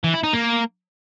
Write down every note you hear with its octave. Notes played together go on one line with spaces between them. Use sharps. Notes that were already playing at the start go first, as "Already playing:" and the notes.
E3
E4
D#4
A#3